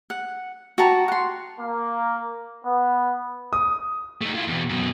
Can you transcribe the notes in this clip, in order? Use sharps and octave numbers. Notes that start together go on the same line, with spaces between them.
F#5
F#4 G4 A5 A#5
F#5 C6
A#3
B3
D#6
A3 D#4
E4 F4
E2 B2
F#2 B2